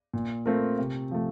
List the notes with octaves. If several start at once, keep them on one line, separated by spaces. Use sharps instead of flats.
A#2
A3 C4 F4 A#4
C3
F3 A3